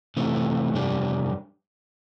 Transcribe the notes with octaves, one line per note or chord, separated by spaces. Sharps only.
C3 E3 A3 C4
F2 C3 G3 D4 G4